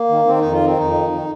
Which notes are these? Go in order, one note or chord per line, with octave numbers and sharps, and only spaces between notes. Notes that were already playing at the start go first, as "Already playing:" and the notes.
Already playing: A#3
D#3
D#3 C4
F2 D#4
F4
D#3 C4
F2 D#4
D#3
D#3